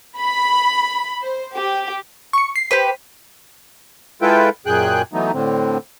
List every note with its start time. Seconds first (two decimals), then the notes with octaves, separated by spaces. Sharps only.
0.17 B5
1.22 C5
1.55 G4
2.33 C#6 C#7
2.56 C7
2.71 G4 B4 C5 B6
4.22 G#3 E4 F4 A4 B4 G5
4.66 F#2 A#2 G#4 G5 F#6
5.13 E3 F#3 A3 B3 D#4
5.33 A2 D3 C4